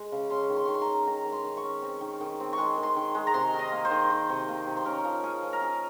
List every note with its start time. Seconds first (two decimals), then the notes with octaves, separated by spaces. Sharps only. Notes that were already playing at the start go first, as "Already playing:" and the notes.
Already playing: G#3
0.12 C#3
0.30 C#4 C6
0.50 D#3
0.56 C6
0.66 D#3 C#6
0.74 C6
0.81 A#5
0.88 C#4
1.07 D#3 A#5
1.26 D#3
1.32 C6
1.44 D#3
1.57 C#6
1.63 C#4
1.82 C4
2.01 D#3
2.21 D#3
2.40 C4
2.53 C#6
2.58 G#3 C6
2.78 D#3
2.83 C6
2.96 D#3
3.15 G#3
3.27 A#5
3.34 C3 C6
3.54 D#3
3.59 D#5
3.72 A#3
3.85 C5
3.91 D#3
4.10 D#3
4.29 C3
4.48 A#3
4.67 C3
4.77 C5
4.85 C#4 A#4
5.04 F3
5.24 C#4 G#4
5.43 F3
5.53 A#4
5.61 C#4 G#4